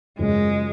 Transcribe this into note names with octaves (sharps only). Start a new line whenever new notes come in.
F#1 F#2 C#3 F3 G#3